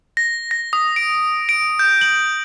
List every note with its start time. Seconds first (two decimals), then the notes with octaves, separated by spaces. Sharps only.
0.17 A#6
0.51 A#6
0.73 D#6
0.96 D7
1.49 D7
1.79 G6
2.01 F#7